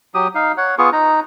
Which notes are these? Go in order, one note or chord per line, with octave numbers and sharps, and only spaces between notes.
F#3 G4 D#6
D#4 F5
C#5 F#5
B3 F4 G#4 C#6
D#4 A#5